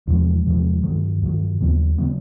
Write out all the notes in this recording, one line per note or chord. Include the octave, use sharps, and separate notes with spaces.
E2 C3 F3 G#3
E2 C3 F3 G#3
G2 D#3 F#3
G2 D#3 F#3
D#2 C#3 F#3 B3
C#3 F#3 B3